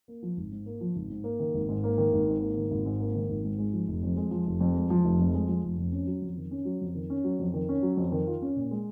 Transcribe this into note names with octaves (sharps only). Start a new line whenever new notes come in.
A#3
F3
G#1
G#2
A#3
F3
G#1
G#2
A#3
D#3
G#1
G#2
A#3
D#3
G#1
G#2
A#3
D#3
G#1
G#2
A#3
D#3
G#1
G#2
G#3
F3
F1
F2
G#3
F3
F1
F2
G#3
F3
F1
F2
G#3
F3
F1
F2
C#4
F#3
F2
D#3
C#4
F#3
F2
D#3
C#4
F#3
F2
D#3
C#4
F#3
F2
D#3
F4
C#4
A#2
G#3